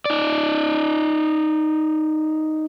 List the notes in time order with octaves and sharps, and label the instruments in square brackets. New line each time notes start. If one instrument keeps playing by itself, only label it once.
[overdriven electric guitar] D#4 D5